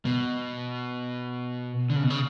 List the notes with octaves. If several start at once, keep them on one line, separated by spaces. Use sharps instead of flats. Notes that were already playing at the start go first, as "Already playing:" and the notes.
B2
D3
C#3
B2
C#3